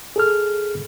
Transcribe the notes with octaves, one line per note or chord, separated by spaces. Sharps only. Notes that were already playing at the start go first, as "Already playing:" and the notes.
G#4 A4 F6